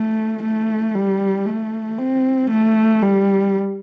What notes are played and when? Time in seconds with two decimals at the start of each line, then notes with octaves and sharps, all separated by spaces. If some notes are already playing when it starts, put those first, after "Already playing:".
Already playing: A3
0.43 A3
0.95 G3
1.46 A3
1.98 C4
2.50 A3
3.02 G3